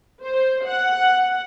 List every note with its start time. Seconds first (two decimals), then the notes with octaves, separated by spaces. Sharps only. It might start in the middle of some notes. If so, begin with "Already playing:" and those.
0.23 C5
0.67 F#5